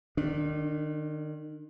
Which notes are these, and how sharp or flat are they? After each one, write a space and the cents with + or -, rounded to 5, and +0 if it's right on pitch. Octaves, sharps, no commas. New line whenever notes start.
D#3 -30 D4 -5